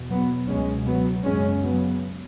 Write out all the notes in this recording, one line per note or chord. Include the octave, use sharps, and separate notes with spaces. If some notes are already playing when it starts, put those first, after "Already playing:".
Already playing: E2 B2
F#3 B3
C#2 B2 G#3 C#4
F#3 B3
F#2 C#3 G#3 C#4
F#3 B3